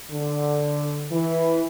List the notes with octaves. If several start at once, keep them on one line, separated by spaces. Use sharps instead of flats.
D3
E3